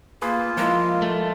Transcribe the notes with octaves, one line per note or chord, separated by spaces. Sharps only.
A#3 F4 G#4 B4
F3 G#3 A#3 E4
A3